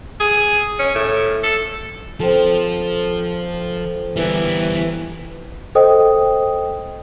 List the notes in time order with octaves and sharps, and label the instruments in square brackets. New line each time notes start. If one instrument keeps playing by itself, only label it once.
[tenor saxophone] G#4
C#4
A2
A4
[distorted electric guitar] F3 [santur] C4 A4
[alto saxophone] E3 [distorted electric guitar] G3 B3 [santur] A#4 D5 G5
[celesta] A4 C5 D#5 G5 D#6